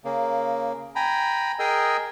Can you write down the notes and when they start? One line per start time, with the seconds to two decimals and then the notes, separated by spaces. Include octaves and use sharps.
0.04 C#3 A#3
0.96 G5 G#5 A#5 B5
1.59 G#4 A#4 D#5 G5 G#5 E6